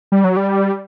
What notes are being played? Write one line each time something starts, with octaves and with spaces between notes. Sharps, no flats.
G3
F#3
G3